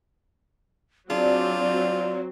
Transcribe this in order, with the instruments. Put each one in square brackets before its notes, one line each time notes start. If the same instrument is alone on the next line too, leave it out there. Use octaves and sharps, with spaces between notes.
[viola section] F#3 C4 [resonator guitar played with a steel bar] D4 G#4 [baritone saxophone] F4 [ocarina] D5